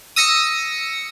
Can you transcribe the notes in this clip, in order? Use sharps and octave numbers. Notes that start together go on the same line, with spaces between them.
D#6 E6 A#6 C#7